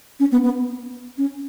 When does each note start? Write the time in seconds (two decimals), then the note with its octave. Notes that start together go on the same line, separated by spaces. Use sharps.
0.20 C#4
0.32 B3
0.44 B3
1.18 C#4